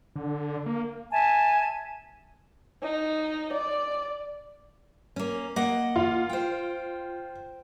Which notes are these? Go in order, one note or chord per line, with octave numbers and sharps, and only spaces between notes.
D3
A#3
E5 G#5 A5
D#4
D5
A#3 C#4
A#3 D#5 F#5
F4
C5 G5